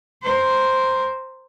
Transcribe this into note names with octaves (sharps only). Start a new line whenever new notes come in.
A#4 C5